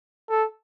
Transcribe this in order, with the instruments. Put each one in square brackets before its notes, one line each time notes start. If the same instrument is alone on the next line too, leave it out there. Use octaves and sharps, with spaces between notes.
[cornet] A4